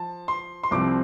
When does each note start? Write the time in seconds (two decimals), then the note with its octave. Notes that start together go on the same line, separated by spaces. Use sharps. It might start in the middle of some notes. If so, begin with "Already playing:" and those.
Already playing: F3 A5
0.28 C6
0.63 C6
0.71 C2 C3 F3 C4 D6